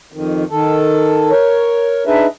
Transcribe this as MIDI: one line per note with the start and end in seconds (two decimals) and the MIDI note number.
0.12 0.44 41
0.12 0.44 51
0.50 1.31 51
0.50 1.31 69
1.31 2.04 70
1.31 2.04 73
2.07 2.27 62
2.07 2.27 63
2.07 2.27 68
2.07 2.27 71
2.07 2.27 75
2.07 2.27 76